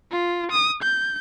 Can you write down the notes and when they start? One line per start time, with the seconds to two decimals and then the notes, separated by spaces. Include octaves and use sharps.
0.11 F4
0.51 D#6
0.82 G6